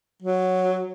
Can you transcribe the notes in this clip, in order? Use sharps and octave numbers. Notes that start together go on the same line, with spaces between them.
F#3